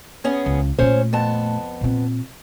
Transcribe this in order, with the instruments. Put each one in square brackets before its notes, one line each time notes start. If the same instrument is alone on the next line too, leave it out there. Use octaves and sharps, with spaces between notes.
[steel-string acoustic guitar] B3 C#4 G#4
[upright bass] C#2
[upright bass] A#2 A3 [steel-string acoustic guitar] C#4 C5 C#5
[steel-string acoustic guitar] F2 B3 A5
[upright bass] A#2 C4